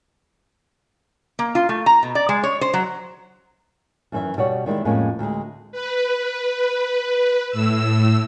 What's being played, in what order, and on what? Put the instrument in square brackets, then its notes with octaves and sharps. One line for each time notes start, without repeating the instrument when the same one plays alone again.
[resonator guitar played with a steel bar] A#3
F4
A3
A#5
B2
D5
G#3
C#5
C5
F#3
[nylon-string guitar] F#2 D#3 E3 C5 E5
B2 G3 C#5 F#5
D#3 G3 G#3 E4
F2 A2 G#3 A#3 C#4
D2 G#3
[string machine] B4
A2 E6